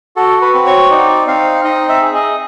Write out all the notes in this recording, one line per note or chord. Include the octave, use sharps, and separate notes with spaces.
F#4 A4
B4
C4
C#5
D#4 D5
C4 F5
D#4 D#5
E5
G#4
D#5